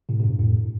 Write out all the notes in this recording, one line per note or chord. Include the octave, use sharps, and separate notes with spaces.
A2 C3
C3
G2 B2
F2 A2